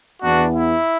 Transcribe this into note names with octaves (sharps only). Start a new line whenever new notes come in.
E2 E3 B3 D4 F#4
E4